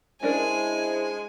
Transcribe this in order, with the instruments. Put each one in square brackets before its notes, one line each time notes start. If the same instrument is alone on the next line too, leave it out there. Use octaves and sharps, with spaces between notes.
[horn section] G#3 [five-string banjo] C#4 D4 A#4 [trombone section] E4 C5 [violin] G#5